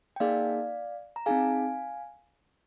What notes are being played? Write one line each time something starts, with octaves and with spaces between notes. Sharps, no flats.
G5
A#3 D#4 G#4 D5 F5
A#5
C4 D#4 G#4 F5 G#5